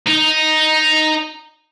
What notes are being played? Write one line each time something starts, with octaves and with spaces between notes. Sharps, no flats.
D#4